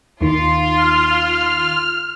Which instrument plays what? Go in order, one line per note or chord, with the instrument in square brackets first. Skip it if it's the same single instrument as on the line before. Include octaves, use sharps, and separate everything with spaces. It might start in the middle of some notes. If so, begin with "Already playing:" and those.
[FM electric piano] D#2 D#3 [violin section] F4 C6
[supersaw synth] F6